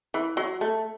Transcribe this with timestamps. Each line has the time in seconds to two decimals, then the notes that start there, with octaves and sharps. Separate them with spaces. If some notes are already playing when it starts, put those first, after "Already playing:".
0.14 E3
0.37 F#3
0.61 A3